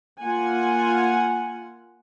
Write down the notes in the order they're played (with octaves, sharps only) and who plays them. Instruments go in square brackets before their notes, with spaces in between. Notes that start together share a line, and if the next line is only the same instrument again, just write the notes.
[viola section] A#3 F4 F#5 G#5